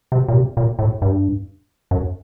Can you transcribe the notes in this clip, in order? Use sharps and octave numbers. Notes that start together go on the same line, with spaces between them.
C3
A#2
C3
A#2
A2
G2
F#2